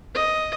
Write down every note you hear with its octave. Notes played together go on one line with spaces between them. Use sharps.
D#5